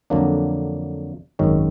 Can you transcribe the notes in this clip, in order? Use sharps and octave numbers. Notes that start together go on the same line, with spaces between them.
F2 D3 F#3 A#3 D4
G#1 F#2 D#3 G#3 C#4